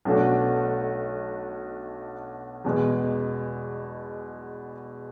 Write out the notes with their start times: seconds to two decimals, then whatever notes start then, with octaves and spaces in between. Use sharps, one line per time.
0.05 B1 B2 A3 D4 F#4
2.64 E2 B2 G#3